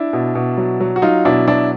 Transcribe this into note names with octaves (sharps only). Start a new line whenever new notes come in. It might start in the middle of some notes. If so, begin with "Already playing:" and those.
Already playing: D4 E4
B2
B2
F#3
F#3
F#4
F#3 D#4 F4
B2 D4 E4
F#3 D4 E4